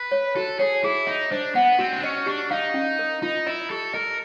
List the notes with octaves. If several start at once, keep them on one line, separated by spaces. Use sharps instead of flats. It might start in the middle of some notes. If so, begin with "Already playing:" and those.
Already playing: B4
C#5
F#4 A4
G#4 C#5
E4 G#4
D#4 E5
D4 C5
B3 F#5
C4 F#4
D4
C#4 D#5
D4 G4
D#4 F5
C#4
A#4
D#4 F4
E4 D#5
G4 A4
A#4 D#5